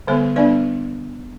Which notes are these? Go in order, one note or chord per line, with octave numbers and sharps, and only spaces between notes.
D3 G3 B3 A4 C5
G3 B3 D4 B4 D5